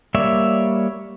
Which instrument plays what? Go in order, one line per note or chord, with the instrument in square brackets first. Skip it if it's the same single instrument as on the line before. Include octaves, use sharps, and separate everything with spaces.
[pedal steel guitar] G3 A#3 C#5 D5 E5